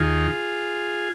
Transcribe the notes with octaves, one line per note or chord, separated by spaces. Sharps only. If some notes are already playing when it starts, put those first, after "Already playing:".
Already playing: D#2 D#3 F4 G#4